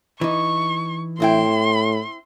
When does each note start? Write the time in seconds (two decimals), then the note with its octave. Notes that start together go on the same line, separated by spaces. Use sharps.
0.21 E3 D#4 C#6
1.20 A2 C4 E4 G5 C6